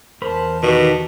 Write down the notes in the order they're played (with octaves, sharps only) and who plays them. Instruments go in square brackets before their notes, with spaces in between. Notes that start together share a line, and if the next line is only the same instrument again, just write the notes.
[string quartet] E2 A5 [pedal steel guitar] A#4 C5 B5
[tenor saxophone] B2 [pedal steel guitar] D#3 G4